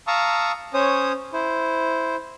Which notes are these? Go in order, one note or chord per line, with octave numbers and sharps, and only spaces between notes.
F5 A5 A#5 C#6 D#6 E6
C#4 C5 C#5 D#6
E4 C5